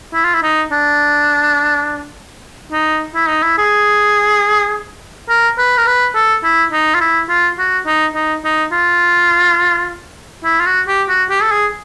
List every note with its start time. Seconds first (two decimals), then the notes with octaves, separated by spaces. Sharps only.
0.14 E4
0.24 F4
0.34 E4
0.43 D#4
0.72 D4
2.72 D#4
3.15 E4
3.28 D#4
3.43 E4
3.58 G#4
5.29 A#4
5.58 B4
5.77 A#4
5.87 B4
6.15 A4
6.44 E4
6.72 D#4
6.94 F4
7.01 E4
7.29 F4
7.59 F#4
7.86 D#4
8.15 D#4
8.45 D#4
8.72 F4
10.44 E4
10.60 F4
10.66 F#4
10.88 G4
11.09 F#4
11.30 G4
11.43 A4
11.52 G#4